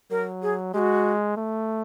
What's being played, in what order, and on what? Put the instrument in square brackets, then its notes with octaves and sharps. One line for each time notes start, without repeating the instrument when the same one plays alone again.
[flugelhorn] F#3 [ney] A#4
[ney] G#4
[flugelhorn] G#3 [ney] F#4 G4
[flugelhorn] A3